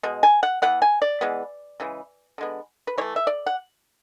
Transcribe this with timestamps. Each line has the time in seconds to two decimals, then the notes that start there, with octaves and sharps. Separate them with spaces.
0.03 B2 G#3
0.23 G#5
0.43 F#5
0.62 E3 B3 F#5
0.82 G#5
1.02 D5
1.21 E3 G#3 B3
1.80 C#3 E3 G#3
2.38 D3 G#3 B3
2.87 B4
2.98 E3 C#5
3.01 A3
3.16 E5
3.27 D5
3.46 F#5